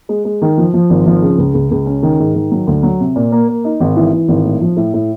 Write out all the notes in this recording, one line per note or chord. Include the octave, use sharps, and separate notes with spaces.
G#3
G#3
D#3
F3
F3
G#1
F3
C#3
C#2
C#2
C#2
C#4
D#3
G#2
D#3
F#3
D2
F#3
C3
A#2
A#3
A#3
D#4
G#1
E3
E3
G#1
A2
F3
A2
A2